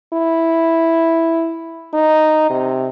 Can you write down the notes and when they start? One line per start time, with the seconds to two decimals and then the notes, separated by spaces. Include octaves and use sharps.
0.14 E4
1.94 D#4
2.50 C3